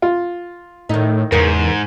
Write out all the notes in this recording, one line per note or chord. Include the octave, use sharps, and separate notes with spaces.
F4
A2 D#3 D#4
E2 G#2 C#3 A#4